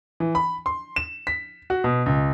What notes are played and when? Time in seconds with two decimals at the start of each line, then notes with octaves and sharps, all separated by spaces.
0.20 E3
0.35 B5
0.66 C6
0.96 E7
1.27 B6
1.70 F#4
1.84 B2
2.06 C#2